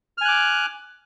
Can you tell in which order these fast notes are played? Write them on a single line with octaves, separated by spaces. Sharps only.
F6 G#5 F#6 D6